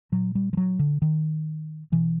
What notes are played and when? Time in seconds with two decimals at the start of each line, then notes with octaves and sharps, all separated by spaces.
0.12 A#2 F#3
0.35 G3
0.53 F3
0.57 F#3
0.79 D3
1.02 D#3
1.92 B2 E3